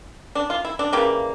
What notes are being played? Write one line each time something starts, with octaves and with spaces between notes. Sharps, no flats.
D4
F4
E4
D4
C#3 E3 G3 A#3